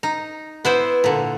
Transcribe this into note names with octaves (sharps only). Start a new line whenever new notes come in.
D#4
B3 E4 B4 C5
A#2 D3